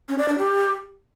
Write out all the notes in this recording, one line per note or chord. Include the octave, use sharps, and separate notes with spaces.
C#4
D5
D4
G4